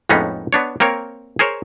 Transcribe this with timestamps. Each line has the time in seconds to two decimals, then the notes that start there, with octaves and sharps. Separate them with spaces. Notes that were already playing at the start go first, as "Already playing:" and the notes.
0.09 F2 A2 G#3 B3 C#4 D#4
0.53 B3 D4 C#5
0.80 A#3 C4 A#4 C#5
1.39 G#4 A#4 C5 C#5